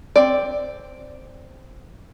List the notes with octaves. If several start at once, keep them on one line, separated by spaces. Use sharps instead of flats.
C4 D5